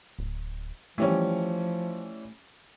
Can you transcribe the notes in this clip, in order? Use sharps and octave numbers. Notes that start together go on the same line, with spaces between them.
D1
E3 F3 G3 A3 C#4